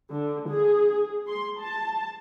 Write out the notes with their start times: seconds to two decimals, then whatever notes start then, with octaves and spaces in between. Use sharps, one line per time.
0.13 D3
0.49 G#4
1.27 C6
1.60 A5